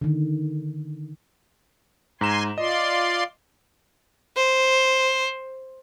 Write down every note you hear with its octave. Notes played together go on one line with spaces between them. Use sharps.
D3 D#3
G#2 G#5 A#5 C6 E7
F4 D5 D#5 C6
C5